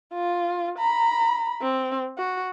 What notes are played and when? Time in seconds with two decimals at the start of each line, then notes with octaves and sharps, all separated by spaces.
0.14 F4
0.78 A#5 B5
1.62 C4
2.18 F#4